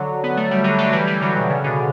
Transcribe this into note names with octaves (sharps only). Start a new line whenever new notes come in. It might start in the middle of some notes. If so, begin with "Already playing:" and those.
Already playing: D3 F#3
B3
A3
G3
D3 F#3
D3 F#3
E3 G3
E3 G3
D3 F#3
B2
C#3
B2 D3